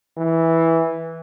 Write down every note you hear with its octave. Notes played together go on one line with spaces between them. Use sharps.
E3